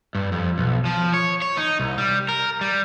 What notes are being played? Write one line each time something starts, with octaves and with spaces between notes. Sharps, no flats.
G2
F2
B1
F3
C#5
C#5
D#4
C2
G3
A#4
G3